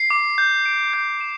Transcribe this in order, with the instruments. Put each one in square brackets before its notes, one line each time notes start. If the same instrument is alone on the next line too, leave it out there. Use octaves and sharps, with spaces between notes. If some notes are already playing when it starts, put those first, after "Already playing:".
Already playing: [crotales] C7
D6
G6
D7
G6
E7